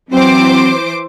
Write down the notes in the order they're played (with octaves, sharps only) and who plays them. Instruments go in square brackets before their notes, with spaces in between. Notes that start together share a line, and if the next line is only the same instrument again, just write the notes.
[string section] E3 C5 D6 [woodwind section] F#3 C4